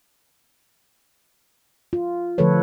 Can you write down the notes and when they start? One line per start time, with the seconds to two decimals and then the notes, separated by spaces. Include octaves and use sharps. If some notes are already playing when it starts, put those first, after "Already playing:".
1.93 F4
2.38 D3 F3 A3 A4 B4 C#5